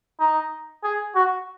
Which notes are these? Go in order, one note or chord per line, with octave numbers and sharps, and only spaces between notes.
D#4
G#4
F#4